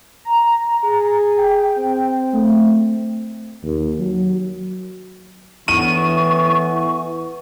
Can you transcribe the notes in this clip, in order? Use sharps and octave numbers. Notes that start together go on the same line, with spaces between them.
A#5
G#4
G5
C4
A3
D#2
F#3
E2 A2 E3 B3 C#6 D#7